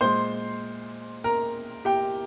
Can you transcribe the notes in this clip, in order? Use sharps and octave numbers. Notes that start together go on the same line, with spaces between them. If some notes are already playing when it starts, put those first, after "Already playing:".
A#2 G#3 C5 C6
A#4 A#5
G4 G5